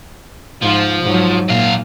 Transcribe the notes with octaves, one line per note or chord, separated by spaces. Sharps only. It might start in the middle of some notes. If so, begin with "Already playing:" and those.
G#2 F3 F4
G#2 F#3
A#2 F#3 F5